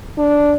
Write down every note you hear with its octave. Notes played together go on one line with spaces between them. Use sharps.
D4